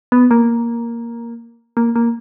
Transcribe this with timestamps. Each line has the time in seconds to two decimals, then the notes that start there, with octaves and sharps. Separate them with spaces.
0.12 B3
0.31 A#3
1.77 A#3
1.96 A#3